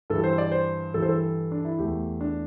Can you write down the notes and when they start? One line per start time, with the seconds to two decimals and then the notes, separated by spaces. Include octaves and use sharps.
0.10 G2 E3 G3 A4
0.24 C5
0.38 D5
0.52 C5
0.94 G2 E3 G3 A4
1.02 C5
1.09 A4
1.52 D4
1.65 E4
1.78 E2 E3 A3 G4
2.21 D4